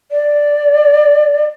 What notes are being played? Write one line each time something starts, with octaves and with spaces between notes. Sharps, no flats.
D5